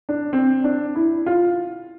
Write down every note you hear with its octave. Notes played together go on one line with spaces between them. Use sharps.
D4
C4
D4
E4
F4